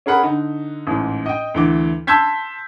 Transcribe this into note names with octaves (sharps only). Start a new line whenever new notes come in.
C#4 G#4 A#4 F#5 B5
D3 D#4
A1 G#2
D#5 G5
D2 E3 D6
A5 C6 E6 G6 G#6 B6